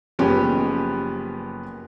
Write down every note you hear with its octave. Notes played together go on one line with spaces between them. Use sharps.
F#1 F3 B3 C#4 G4